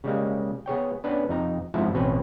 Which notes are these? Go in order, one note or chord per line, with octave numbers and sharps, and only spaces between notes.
C#3 G3 G#3 A#3
B3 G#4 C#5 G5
B3 C#4 D4 B4
F2 D#4 A#5
F2 G#2 F3 E4 E5 A5
A1 B2 C4 C#4 B4